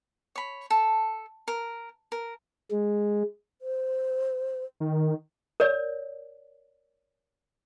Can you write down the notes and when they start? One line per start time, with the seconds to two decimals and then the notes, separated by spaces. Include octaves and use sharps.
0.36 C#5 B5
0.70 A4
1.48 A#4
2.12 A#4
2.71 G#3
3.60 C5
4.80 D#3
5.60 A#4 C#5 D5